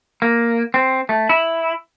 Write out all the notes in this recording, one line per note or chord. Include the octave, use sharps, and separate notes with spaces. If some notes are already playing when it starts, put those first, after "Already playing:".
A#3
C4
A3
E4